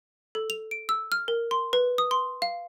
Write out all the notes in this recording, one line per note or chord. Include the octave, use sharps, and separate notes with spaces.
A4
F7
D7
E6
F6
A#4
C6
B4
D#6
C6
F5